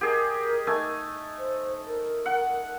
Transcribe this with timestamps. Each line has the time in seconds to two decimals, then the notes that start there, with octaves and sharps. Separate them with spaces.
0.01 G4 G#4 A#4 D#5
0.67 A3 D#4 G#5
1.39 C5
1.87 A#4
2.26 F#5